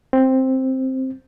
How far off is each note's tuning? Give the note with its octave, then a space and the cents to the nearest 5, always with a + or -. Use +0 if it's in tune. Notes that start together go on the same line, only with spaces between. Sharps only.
C4 +5